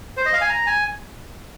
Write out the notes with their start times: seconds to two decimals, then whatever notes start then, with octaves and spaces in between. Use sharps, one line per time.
0.17 C5
0.25 D#5
0.33 F5
0.41 G#5
0.49 A#5
0.66 G#5